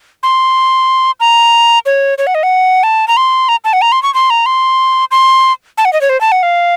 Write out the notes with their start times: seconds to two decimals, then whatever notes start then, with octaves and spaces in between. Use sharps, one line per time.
0.23 C6
1.20 A#5
1.86 C#5
2.18 C#5
2.27 F#5
2.35 D#5
2.43 F#5
2.83 A5
3.08 A#5
3.17 C6
3.49 A#5
3.65 A5
3.73 F#5
3.82 A#5
3.92 C6
4.03 C#6
4.14 C6
4.30 A#5
4.46 C6
5.11 C6
5.78 A5
5.85 F#5
5.93 D#5
6.01 C#5
6.09 C5
6.21 A5
6.32 F#5
6.43 F5